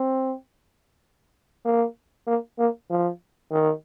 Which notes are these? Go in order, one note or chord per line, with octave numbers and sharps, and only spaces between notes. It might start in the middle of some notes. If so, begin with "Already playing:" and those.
Already playing: C4
A#3
A#3
A#3
F3
D#3